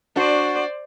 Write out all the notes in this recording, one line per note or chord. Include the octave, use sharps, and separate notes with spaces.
D4 F#4 C5 D5